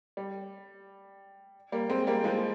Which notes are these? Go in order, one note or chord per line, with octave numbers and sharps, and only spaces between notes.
G3
G3 A#3
G#3 C4
G3 A#3
F3 G#3